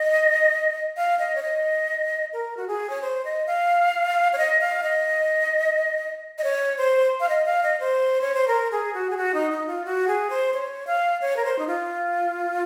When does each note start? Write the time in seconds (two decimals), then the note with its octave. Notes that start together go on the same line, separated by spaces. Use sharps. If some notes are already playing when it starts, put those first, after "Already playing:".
Already playing: D#5
0.97 F5
1.19 D#5
1.35 C#5
1.43 D#5
2.33 A#4
2.57 F#4
2.68 G#4
2.90 C#5
3.02 C5
3.25 D#5
3.47 F5
4.33 C#5
4.38 D#5
4.61 F5
4.83 D#5
6.38 D#5
6.44 C#5
6.78 C5
7.20 F5
7.29 D#5
7.46 F5
7.63 D#5
7.80 C5
8.21 C#5
8.34 C5
8.48 A#4
8.72 G#4
8.94 F#4
9.10 G#4
9.17 F#4
9.34 D#4
9.51 D#4
9.67 F4
9.85 F#4
10.08 G#4
10.30 C5
10.54 C#5
10.87 F5
11.22 C#5
11.37 A#4
11.45 C5
11.59 D#4
11.67 F4